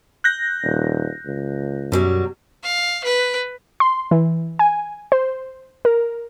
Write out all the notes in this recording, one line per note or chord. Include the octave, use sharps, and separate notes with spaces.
F#6 G6 A#6
D#1
C#2
F#2 B2 F#3 G3
F5
B4
C6
E3
G#5
C5
A#4